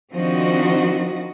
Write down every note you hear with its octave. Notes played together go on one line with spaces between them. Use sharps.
D#3 F3 C4 D4 F#4 D#5